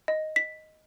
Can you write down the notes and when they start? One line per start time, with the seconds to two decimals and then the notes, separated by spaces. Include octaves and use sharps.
0.08 D#5
0.36 B6